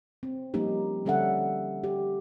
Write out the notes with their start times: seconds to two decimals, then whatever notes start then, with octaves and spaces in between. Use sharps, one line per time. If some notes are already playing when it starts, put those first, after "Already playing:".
0.23 C4
0.54 F3 G3 A#3 C#4 D#4 G4
1.05 D3 G3 C#4 A4 E5 F#5
1.84 G4